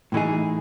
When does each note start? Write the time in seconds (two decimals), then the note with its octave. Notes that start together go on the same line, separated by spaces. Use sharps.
0.12 A2 E3 A3 D#4 G#4